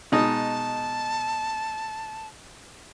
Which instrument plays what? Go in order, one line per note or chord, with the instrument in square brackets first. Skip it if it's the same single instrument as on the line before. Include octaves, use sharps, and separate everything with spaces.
[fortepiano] B2 G#3 D#4 [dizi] A5